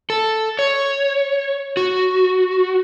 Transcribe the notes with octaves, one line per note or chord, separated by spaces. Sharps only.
A4
C#5
F#4